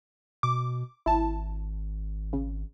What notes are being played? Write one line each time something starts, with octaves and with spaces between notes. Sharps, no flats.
B2 D6
G#1 E4 A5
C#3